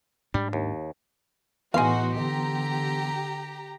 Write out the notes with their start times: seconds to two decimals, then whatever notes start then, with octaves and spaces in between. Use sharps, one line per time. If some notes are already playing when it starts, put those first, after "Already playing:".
0.34 G#2 G3 D4
0.53 D#2
1.74 A2 E3 B3 D#4 F#4 G#4 F5 C6
2.17 D3 G4 A#5